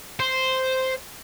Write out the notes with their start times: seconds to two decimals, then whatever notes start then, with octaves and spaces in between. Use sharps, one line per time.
0.20 C5